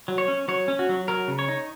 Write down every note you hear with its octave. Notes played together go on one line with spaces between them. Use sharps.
F#3
C#5
C#4
F#3 C#5
C#4
F#4
F#3
F#3 A#4
C#3
C#5
D#4